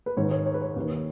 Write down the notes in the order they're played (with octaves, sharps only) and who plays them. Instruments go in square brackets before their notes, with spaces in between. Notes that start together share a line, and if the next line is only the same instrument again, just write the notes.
[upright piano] B4
G#2 D#3 C#5
C#5
C#5
B4
C#5
D#2 D#3